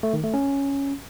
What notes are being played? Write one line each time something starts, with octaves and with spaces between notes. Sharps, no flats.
A3
D#3
A3
C#4